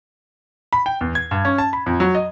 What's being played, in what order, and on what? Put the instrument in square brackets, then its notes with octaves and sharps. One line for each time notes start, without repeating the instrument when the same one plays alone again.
[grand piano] B5
G5
E2
G#6
G2
C#4
A5
B5
F2
F#3
D#5